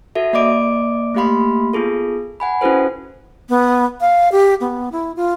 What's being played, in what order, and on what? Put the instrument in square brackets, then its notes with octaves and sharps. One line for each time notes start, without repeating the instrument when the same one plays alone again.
[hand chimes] F#4 A4 E5
A#3 D5 D#5 D6 D7
A3 A#3 G4 F5 B5 C6
B3 F4 G#4 A4
F#5 G#5 B5
C#4 E4 F#4 A4 B4 C5
[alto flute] B3
F5
G4
B3
E4
F4